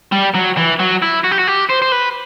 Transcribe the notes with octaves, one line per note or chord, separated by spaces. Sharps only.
G3
F#3
E3
F#3
E4
F#4
G4
F#4
G4
C5
C5
B4